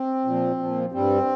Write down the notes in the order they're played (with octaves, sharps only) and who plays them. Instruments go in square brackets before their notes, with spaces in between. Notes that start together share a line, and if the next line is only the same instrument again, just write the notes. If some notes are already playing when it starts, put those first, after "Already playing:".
Already playing: [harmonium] C4
A#2 F3
A#2 F3
G2 G3 C4